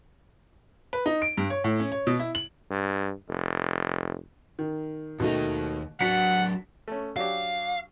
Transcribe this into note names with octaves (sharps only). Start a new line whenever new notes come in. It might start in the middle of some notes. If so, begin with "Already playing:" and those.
B4
D#4
D7
G2
C#5
A2
C#4
C#5
B2
E4
F#7
G2
F1
D#3
D#2 B2 D#3 A3 D#4
F#3 D4 F#4 F#5 B6 C#7
A3 C#4
F#3 D4 G4 F5